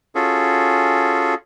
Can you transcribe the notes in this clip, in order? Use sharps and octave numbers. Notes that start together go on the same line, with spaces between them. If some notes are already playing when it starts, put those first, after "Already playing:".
C#4 F4 F#4 G#4 A4